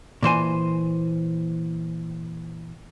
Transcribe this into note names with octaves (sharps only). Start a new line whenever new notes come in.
A#2 E3 C5 G#5